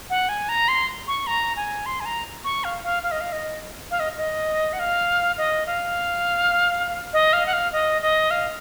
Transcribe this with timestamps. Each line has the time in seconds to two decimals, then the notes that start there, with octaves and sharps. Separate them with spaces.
0.10 F#5
0.29 G#5
0.49 A#5
0.68 C6
1.08 C#6
1.27 A#5
1.56 G#5
1.86 C6
2.01 G#5
2.05 A#5
2.44 C#6
2.64 F5
2.84 F5
3.03 F5
3.11 D#5
3.21 F5
3.32 D#5
3.91 F5
4.00 D#5
4.18 D#5
4.73 F#5
4.79 F5
5.38 D#5
5.67 F5
7.13 D#5
7.33 F5
7.46 F#5
7.53 F5
7.72 D#5
8.02 D#5
8.31 F5